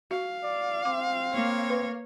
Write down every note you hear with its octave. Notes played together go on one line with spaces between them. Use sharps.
F#4 F5
D5
C4 D6
A#3 C#5
B4